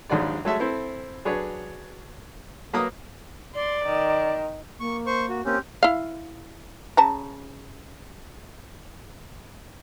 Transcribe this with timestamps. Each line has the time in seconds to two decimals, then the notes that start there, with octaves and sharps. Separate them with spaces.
0.09 A#1 D#2 G#2 F#3 F#4 D5
0.45 F#3 G#3 A3 A4 E5
0.60 C4 E4 A4 C5
1.25 F#3 D4 G#4 B4 C#5
2.73 F#3 A#3 B4 A#5 D#6
3.55 D5 C6
3.86 D#3
4.80 A#3 C#6
5.06 C5 C#6
5.29 F#4
5.45 A#3 C4 C#4 G4
5.83 E4 F5
6.97 C#3 A5 A#5